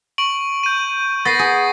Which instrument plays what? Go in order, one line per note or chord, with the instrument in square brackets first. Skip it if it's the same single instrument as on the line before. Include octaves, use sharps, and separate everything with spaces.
[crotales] C#6 D7 F#7
G6 D#7
[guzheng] B3 [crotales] A6 A#6 C7
[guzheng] G#4